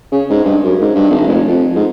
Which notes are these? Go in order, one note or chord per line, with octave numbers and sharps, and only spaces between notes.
C#3
G#2
G2
F#2
G#2
G2
G#1
F1
F2
G#2